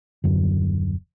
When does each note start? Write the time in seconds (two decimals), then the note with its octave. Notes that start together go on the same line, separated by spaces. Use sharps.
0.24 D#1 F#2 D3